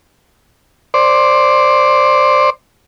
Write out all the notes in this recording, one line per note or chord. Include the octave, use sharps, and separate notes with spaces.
C5 D5